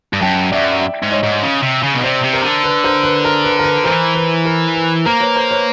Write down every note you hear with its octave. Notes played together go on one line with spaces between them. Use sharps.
G2
F#2 G5 A5
F#2 D5 E5
G#2
C#5 D#5
G#2
C#3
C3
C#3
B2
C3 C5 D5
C3
A#4 C5
D3
B4
A#4 C5
B4
A#4
B4
A#4
B4
E3 A#4 C5
B4
A#4
B4
A#3 A#4 C5
B4 C#5
A#4 C5
B4 C#5